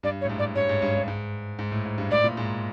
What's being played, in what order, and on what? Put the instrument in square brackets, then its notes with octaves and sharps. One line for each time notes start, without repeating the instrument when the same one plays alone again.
[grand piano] G2 [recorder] D5
[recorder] C#5
[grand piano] A2
G#2
[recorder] D5
[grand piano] G2 [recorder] C#5
[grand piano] G#2
G2
G2
G#2
G#2
A2
G#2
G2
[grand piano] A2 [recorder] D5
[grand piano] A#2
G#2